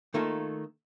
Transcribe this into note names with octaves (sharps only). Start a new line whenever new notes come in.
D#3 A3 A#3 D#4 F4 A4